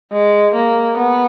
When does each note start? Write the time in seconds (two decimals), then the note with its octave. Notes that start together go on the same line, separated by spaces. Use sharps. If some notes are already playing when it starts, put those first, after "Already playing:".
0.12 G#3
0.55 A#3
0.97 B3